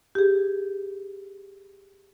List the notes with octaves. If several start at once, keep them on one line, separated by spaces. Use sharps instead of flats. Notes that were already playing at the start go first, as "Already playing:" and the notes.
G4 G#4